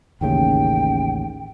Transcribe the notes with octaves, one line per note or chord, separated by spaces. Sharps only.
A1 D#2 C#3 G5